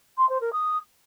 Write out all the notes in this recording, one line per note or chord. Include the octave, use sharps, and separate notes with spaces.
C6
C5
A#4
D#6